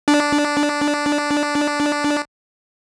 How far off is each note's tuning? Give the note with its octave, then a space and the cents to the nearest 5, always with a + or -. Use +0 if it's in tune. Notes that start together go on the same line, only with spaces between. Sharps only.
D4 -5